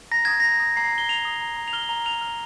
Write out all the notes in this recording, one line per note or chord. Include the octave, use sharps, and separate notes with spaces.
A#5 A#6
D#6 G#6
A#5 A#6
D#6
A#5 C7
A#5
G7
A#5 F7
D#6
A#5
A#5
F7
F6 G7
A#5 F7
F6 F7
F6